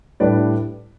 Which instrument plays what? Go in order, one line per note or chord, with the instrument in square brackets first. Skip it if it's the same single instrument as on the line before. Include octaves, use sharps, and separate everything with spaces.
[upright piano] A2 G3 D4 B4 D5